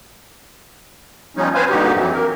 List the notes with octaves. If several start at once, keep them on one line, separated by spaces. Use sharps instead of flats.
F3 G3 B3 C#4 D#4
B3 C4 B4 C5 F5 G#5
G2 A#2 D3 D#4 F#4 G4
F2 E3 F#3
A#3 A#4